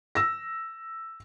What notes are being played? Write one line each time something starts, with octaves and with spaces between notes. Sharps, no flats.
E6 A#6